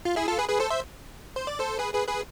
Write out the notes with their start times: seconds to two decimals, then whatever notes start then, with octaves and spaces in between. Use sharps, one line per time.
0.05 F4
0.16 E4 G#4
0.28 F4 A4
0.38 G#4 B4
0.49 G#4 B4
0.60 A4 C5
0.70 C5 E5
1.36 C5
1.47 D5
1.59 A4 C5
1.79 G#4 B4
1.94 G#4 B4
2.08 G#4 B4